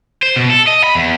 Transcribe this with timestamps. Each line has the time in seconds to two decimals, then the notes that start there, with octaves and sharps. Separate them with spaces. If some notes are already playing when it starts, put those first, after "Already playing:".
0.23 C5
0.36 B2
0.50 A4
0.67 D#5
0.84 B5
0.95 E2